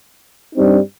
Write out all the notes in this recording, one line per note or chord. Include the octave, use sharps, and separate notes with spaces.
G2 G3 C4 D#4